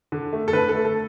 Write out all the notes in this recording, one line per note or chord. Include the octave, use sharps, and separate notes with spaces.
D3
A3
A4
D3 B4
A4
A3
A4